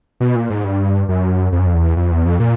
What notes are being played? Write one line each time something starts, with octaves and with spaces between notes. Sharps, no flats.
B2
A#2
G#2
G2
F#2
F2
F#2
F2
E2
F2
E2
F2
A#2